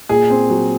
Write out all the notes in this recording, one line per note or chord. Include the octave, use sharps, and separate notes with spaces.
A#2 G#4
C4
F#3